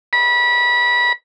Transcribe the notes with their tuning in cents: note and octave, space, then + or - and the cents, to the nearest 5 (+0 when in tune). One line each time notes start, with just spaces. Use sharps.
B5 -25